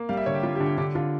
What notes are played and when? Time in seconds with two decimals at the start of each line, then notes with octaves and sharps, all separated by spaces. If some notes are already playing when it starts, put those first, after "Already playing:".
Already playing: A#3
0.09 G3 F5
0.17 E5
0.26 D3 C#5
0.34 G4
0.43 G3 F4
0.55 G4
0.60 D3
0.66 G4
0.78 D3 G4
0.95 D3 F4